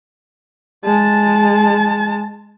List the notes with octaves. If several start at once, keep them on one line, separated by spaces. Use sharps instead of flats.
G#3 A5